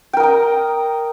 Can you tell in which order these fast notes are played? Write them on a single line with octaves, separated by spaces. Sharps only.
G5 A#4 D#5 A#5